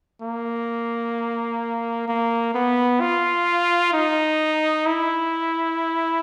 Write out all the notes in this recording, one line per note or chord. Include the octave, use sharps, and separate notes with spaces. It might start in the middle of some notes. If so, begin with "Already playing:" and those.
A#3
A#3
B3
F4
D#4
E4